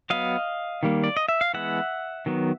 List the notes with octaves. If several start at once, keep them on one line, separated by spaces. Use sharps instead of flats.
F#3 B3 D#5 F5
D#3 G3 A#3
D5
D#5
E5
F5
E3 G#3 B3 E5 F#5
D#3 F#3 B3